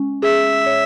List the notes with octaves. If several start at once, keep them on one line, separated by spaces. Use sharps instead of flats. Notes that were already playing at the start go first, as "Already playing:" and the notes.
Already playing: G#3 C#4
G#4 E5
C#5